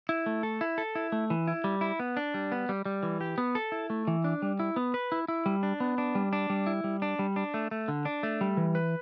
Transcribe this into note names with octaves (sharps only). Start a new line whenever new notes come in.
E4
A3
A4
E4
A4
E4
A3
E3
E4
G3
E4
B3
D4
G3
B3
G3
G3
E3
G4
B3
A4
E4
A3
E3
D4
G3
E4
B3
B4
E4
E4
G3
D4
B3
D4
G3
D4
G3
E4
G3
D4
G3
D4
A3
A3
D3
D4
A3
G3
E3
B4